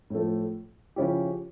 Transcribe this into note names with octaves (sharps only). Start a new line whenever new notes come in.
A2 F3 A3
C#3 F3 C#4 E4 G4